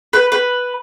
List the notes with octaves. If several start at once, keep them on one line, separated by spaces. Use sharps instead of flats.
B4
B4